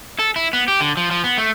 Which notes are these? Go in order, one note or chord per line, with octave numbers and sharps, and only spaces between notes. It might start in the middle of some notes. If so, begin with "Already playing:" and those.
A4
E4
B3
G4
D3
F3
F3
B3
A3